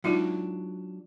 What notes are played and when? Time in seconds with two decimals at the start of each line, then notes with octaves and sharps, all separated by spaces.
0.04 F#3 G#3 D4 D#4 F4